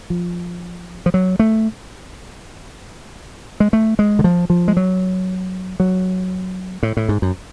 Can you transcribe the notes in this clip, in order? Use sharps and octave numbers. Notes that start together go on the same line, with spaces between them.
F3
F3
F#3
A3
G#3
A3
G#3
D3
F3
F3
G#3
F#3
F#3
A2
A2
G#2
F#2